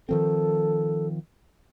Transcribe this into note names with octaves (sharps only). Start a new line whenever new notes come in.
D#3 F3 C4 A4